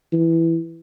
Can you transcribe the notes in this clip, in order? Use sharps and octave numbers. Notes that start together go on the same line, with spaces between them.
E3